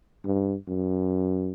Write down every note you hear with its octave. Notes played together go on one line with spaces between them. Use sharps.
G2
F#2